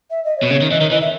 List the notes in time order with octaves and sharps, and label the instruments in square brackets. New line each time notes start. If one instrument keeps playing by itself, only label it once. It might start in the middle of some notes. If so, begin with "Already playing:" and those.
[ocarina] E5
D#5
C#5
[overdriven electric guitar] B2
[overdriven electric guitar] C#3 [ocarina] C#5
[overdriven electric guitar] D#3
[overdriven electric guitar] E3 [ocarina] D#5
[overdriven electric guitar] D#3
[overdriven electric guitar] E3 [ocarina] D#5
[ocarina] E5